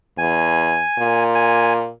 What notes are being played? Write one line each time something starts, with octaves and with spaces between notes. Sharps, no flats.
E2 G#5
A#2
G#5